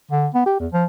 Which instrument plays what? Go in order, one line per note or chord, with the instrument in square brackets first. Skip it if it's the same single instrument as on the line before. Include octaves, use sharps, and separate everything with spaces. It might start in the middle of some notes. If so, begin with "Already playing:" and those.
[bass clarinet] D3
B3
G4
E2
F3